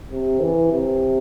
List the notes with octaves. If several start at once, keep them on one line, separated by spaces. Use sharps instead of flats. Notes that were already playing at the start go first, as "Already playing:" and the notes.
C3
E3
C3